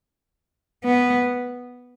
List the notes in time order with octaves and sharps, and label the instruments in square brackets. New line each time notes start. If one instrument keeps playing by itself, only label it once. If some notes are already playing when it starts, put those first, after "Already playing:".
[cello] B3